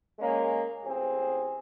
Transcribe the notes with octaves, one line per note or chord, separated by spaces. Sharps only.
G#3 A#3 C#4
A1 C4 G#4